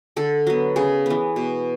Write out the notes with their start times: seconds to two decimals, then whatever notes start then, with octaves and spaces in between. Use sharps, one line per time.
0.16 D3 A4
0.47 F#3 B3
0.76 C#3 G#4
1.06 E3 B3
1.36 B2